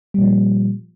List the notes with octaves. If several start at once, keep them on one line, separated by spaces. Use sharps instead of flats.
A#2 F3 G3